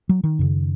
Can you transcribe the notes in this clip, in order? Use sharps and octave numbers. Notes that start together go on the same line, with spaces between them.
F#3
D#3
F#2 C#3